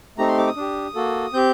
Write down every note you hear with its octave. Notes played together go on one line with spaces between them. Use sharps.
A3 C4 D#4 G4 A#5
C6
D6
D#6
D4 G4
A#3 F#4 A4
C4 G4 G6